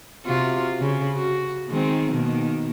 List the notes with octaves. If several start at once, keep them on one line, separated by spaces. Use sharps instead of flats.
C3 F4 F#4
C#3
F#4
D#3 G#3 C4
B2 D#3 A#3